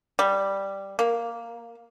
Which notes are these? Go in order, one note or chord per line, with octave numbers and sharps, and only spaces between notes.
G3
A#3